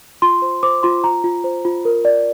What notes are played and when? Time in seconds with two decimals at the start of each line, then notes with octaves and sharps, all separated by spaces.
0.22 F4 C6
0.42 C5
0.63 C5 D6
0.83 F4 C6
1.04 F4 A#5
1.24 F4
1.44 C5
1.65 F4
1.85 A#4
2.05 D5